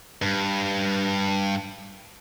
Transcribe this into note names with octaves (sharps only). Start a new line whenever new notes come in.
G2